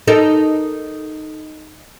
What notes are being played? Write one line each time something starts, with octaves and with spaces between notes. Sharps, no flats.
D#4 A4 A#4